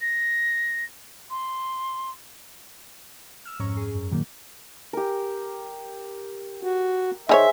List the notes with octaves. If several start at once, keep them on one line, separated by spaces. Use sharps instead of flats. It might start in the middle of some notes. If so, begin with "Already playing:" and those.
A#6
C6
E6 F6
F2 G#2 C#4 A#5 C#6
G#4
F#2
A#2 D#3 F#3 A#3
G4 A#4
F#4
D#3 D#4 G#4 C5 C#5 E5